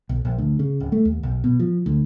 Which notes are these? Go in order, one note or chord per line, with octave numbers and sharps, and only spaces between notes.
B1
A#1
D2
C#3
D1
A3
D#2
B1
B2
F3
D2